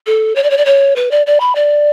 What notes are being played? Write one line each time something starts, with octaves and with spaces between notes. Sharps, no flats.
A4
C#5
D5
C#5
D5
C#5
B4
D5
D5
B5
D5